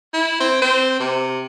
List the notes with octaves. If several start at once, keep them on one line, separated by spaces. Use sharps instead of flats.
E4
C4
C4
C3